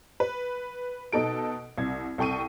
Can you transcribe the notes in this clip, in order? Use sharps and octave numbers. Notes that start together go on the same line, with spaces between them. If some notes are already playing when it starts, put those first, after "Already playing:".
B4
B2 D#4 A4 D7
C2 G#6
C2 A4 G5 C#6 D#7